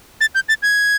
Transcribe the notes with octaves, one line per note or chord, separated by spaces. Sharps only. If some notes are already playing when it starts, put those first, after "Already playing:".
A6
G6
A6
G#6